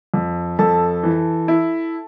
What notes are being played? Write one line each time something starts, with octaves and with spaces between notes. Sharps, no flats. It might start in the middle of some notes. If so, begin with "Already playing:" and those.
F2
F2 A4 A5
E3
E4